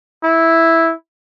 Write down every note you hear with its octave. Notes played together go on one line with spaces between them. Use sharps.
E4